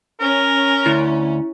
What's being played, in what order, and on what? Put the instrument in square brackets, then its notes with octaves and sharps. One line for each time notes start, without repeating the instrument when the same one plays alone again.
[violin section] C#4 [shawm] A#4
[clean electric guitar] D2 [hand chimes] E4